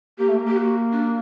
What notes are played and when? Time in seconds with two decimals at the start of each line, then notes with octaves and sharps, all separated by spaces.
0.19 A#3 G4
0.29 A3
0.38 A#3
0.47 G4
0.57 F#4
0.92 D4